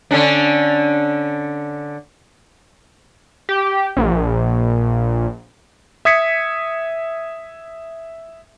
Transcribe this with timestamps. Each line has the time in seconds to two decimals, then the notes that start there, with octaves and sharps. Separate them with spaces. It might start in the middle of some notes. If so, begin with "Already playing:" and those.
0.11 D3 C#4 D4
3.49 G4
3.97 A#1
6.05 E5 D#6 G#6 B6 C#7